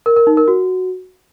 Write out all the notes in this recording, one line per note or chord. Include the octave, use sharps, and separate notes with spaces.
A#4
A#4
D#4
A#4
F#4